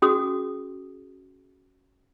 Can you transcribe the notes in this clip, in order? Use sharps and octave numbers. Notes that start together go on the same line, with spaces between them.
C#4 F#4 G#4 D#6